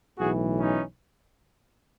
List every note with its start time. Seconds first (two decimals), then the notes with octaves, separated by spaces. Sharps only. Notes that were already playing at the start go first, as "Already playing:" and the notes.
0.18 B1 A2 E3 F#4 G#4
0.59 C#4 D#4